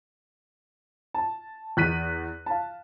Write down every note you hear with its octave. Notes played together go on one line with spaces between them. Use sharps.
A5
E2 F#6 B6 D#7
F5 A5